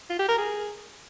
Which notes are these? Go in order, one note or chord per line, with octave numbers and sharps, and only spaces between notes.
F4
G4
A#4
G#4